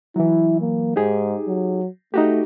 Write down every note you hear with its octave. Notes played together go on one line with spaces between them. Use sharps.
E3 F#3 E4
A#3
G#2 D#4 G4 G#4
F#3
A3 D#4 F#4 G4